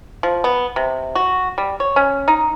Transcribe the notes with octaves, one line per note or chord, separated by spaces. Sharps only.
F3
B3
C3
F#4
G3
C#5
C#4
D#4